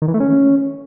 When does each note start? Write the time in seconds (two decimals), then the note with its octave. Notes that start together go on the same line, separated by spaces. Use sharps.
0.02 D#3
0.08 E3
0.14 A3
0.20 C#4